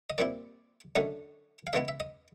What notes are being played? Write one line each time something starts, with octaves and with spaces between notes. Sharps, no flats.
D#5
A#2 G3 C4 E4 D5
F#2 D3 F#3 A3 C#4 D#5
F5
C#3 E3 G#3 B3 E4 E5
E5
D#5